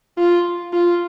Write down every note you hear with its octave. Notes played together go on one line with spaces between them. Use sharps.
F4
F4